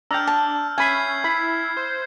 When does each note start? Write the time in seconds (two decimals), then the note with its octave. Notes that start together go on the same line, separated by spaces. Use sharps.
0.11 D4 G5 A#5 E6 F6 G6
0.27 A5
0.78 C#4 E5 G#5 B5 G#6 C7
1.24 E4 B5
1.77 C5